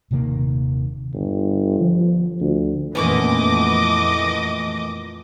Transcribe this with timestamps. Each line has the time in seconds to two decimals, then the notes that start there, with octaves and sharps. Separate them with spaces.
0.11 D#1 C3 D#3 A#3
1.14 G1
1.80 F3
2.41 D2
2.95 F2 A#2 E3 A3 B3 C#4 D#5 D6